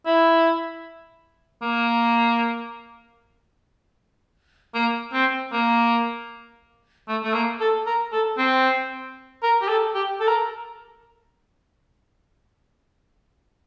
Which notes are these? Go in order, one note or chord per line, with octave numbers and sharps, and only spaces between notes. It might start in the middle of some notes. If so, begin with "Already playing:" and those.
E4
A#3
A#3
C4
A#3
A3
A3
A#3
A4
A#4
A4
C4
A#4
G4
A4
G4
A4
A#4